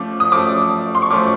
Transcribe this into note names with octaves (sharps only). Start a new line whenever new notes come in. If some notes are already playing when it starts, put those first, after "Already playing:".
Already playing: F3 A3 C#4 D6
D#6
F3 A3 C#4 D6
C6
C#6
F3 A3 C#4 D6